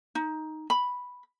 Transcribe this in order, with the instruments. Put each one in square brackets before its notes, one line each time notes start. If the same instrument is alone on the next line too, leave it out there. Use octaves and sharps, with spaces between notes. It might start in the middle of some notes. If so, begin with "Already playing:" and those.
[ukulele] D#4
B5